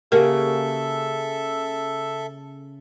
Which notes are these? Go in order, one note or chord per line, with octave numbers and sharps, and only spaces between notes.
C#3 A#3 F#4 G4 A4 A#4 E5